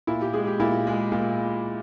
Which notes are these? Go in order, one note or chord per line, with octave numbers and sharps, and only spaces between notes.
A#2 E4
G4
G#3 G#4
G4
A#2 E4
G#3
A#2